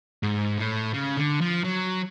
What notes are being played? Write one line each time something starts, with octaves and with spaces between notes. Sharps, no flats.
G#2
A2
C#3
D3
F3
F#3